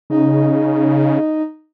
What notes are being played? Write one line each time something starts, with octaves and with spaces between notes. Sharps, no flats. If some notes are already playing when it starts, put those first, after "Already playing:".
C#3 D#4